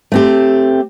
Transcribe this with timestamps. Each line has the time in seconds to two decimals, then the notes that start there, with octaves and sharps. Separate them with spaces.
0.12 A3 C4 G4